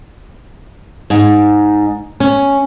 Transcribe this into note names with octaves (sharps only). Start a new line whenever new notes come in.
G#2
C#4